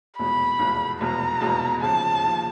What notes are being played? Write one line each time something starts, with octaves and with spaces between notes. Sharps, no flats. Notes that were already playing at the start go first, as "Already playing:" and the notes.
F1 E2 B2 G#3 B3 B5
F1 E2 B2 G#3 B3
F1 E2 B2 G#3 B3 A#5
F1 E2 B2 G#3 B3
D#2 C#3 F3 A5
D#2 C#3 F3